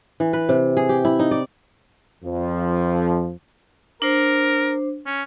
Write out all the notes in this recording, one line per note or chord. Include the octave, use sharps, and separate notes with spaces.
E3
B4
C3
G#4
G4
E4
D#4
D5
F2 F3
D4 A#4 C5
C#4